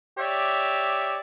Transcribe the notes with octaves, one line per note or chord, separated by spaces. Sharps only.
G4 C#5 D5 E5